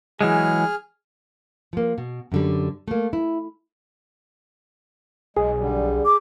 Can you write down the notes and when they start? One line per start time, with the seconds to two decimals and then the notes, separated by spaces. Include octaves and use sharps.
0.21 E3 F#3 G#3 G#4 F6
1.73 F3 A#3
1.98 B2
2.32 F#2 D3 G3
2.88 A3 A#3
3.13 E4
5.37 B1 G#3 G#4
5.58 D3 G3
6.05 D6